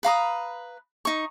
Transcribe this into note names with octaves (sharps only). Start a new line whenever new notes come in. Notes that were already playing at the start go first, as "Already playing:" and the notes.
B4 F5 A#5 D#6
D#4 C#6